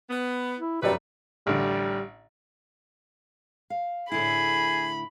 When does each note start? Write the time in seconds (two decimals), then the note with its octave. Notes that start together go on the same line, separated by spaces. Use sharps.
0.10 B3
0.58 E4
0.82 F1 F#2 A3 G4 B4 D5
1.47 A1 D3 G3
3.70 F5
4.12 A2 D3 E4 G#4 B5